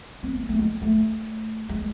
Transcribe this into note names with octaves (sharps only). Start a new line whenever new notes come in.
C4
A#3
A3
G#3
A3
G#3